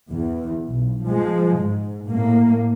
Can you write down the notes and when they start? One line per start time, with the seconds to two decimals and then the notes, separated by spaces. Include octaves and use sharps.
0.10 E2
0.65 B1
1.05 F3 G#3
1.58 G#2
2.07 A2 A#3